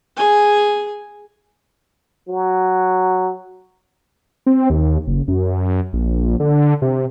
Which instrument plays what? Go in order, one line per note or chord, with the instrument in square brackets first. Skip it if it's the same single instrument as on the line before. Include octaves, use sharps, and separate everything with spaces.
[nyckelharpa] G#4 G#5
[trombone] F#3
[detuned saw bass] C4
D#2
F#1
F#2
A#1
D3
C3